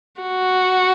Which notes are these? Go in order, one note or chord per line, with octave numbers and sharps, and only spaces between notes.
F#4